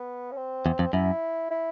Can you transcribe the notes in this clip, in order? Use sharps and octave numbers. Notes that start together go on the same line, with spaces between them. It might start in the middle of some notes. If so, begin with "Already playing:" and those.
Already playing: B3
C#4
C4
E2
F2
F#2 E4
E4